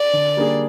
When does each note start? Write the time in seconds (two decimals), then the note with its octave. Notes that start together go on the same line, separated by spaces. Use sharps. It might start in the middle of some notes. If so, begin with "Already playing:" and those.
Already playing: D5
0.13 D3
0.37 G3 A#3 D4 G#4